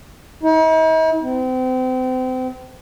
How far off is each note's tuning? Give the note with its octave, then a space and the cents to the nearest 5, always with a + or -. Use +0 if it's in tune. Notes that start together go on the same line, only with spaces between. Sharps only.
D#4 +45
C4 -35